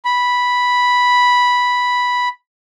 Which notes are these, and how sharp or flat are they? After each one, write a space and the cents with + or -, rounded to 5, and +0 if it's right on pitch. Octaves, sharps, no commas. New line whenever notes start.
B5 -5